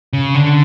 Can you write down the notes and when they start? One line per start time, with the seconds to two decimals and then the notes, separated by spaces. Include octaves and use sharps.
0.13 C#3
0.34 D3